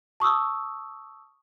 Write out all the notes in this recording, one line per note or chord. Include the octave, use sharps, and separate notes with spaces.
A5 C#6 D#6 E6